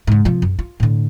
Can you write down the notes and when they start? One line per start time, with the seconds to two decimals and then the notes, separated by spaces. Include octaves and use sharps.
0.07 G#2 C#3
0.25 C3 F3
0.42 F#2
0.59 F4
0.80 A2 D3